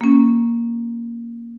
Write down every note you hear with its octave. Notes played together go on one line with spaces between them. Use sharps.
A#3 C#4